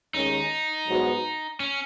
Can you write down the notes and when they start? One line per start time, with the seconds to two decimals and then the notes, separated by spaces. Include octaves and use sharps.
0.14 D#2 D#3 G#3 C#4 D#4
0.88 G#2 F#3 B3 F#4
1.60 C#4